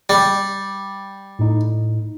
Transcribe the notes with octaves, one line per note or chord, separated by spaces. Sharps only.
G3
A2 D#4